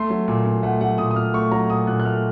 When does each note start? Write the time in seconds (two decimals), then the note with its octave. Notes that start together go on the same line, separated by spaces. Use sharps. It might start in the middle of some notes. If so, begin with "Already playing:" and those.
Already playing: A3 C6
0.10 F#3
0.28 A#2
0.46 A#2
0.63 A3 F#5
0.81 F#3 F#5
0.98 A#2 D#6
1.11 D#6
1.16 A#2 F6
1.34 A3 C#6
1.51 F#3 A#5
1.70 A#2 D#6
1.87 A#2 F#6
2.00 F#6
2.05 A3 F6